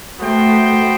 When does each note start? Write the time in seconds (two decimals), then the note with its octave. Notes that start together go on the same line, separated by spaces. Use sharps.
0.19 A3 B3 F#4 C5 G5